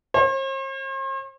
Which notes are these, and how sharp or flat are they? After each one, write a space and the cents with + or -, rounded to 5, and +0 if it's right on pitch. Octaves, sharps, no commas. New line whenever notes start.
C5 +45